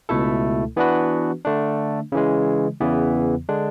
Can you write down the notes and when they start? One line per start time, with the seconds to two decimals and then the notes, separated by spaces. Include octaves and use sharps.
0.09 C#2 B2 A3 E4 A4
0.77 E3 B3 D4 F#4 B4
1.45 D3 A3 D4
2.12 C#3 E3 G#3
2.80 E2 C#3 E3 B3
3.49 D3 G#3 D4